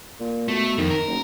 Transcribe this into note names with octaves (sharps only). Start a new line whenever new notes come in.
A#2
B2 A3
F2 D#3
A#4
F#1